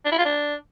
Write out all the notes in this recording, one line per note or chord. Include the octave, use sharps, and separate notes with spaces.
D4
E4
F4
D4